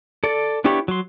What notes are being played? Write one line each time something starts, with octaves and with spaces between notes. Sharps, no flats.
A4 D5
B3 D4 E4 G4 C#5
F#3 C6